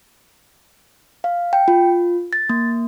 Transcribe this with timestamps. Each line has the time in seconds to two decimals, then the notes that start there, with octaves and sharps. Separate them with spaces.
1.24 F5
1.53 G5
1.68 F4
2.33 A6
2.49 A#3